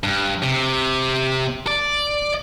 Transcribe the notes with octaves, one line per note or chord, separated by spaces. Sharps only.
G2
C3
D5